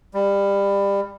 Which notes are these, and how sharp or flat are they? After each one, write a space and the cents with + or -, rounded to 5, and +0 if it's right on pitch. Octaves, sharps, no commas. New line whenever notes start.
G3 +25